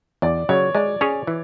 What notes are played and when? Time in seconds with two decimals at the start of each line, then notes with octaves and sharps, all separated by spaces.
0.22 E2 D5
0.49 C#3 F#3 C#5
0.75 G#3 D5
1.01 C#4 G#4 C#5
1.27 E3